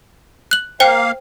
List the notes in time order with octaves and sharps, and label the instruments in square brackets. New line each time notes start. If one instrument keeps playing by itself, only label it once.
[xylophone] F#6 F#7
[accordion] A#3 F5 [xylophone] C5 G5